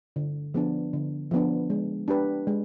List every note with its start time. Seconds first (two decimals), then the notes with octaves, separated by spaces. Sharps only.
0.16 D3
0.54 F3 B3 D4
0.93 D3
1.31 F3 B3 D4
1.70 G#3
2.08 D4 G4 B4
2.47 G#3